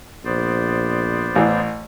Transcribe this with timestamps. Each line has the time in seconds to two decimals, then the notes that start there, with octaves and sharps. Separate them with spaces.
0.25 A#1 B3 C5 D5
1.35 A1 E3